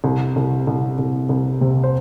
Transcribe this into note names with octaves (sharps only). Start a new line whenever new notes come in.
C2
C2
C2
C2
C2
C3
C5